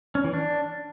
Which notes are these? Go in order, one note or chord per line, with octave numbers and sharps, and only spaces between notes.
C#4
E3
D4